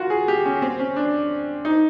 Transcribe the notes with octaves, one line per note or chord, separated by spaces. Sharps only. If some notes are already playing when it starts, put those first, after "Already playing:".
Already playing: F4 F#4 A#4
G#4
G4
C#4
C4
C#4
D4
D#4